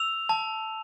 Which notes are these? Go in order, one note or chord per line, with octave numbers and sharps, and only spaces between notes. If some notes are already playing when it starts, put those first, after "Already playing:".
Already playing: E6 F7
A5